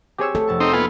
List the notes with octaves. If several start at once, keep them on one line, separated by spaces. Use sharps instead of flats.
C4 G4 G#4 C#5 E6
A3 A4
F1 A5 C#6
C4 D#4
A#3 B3 D#4 F4 G#5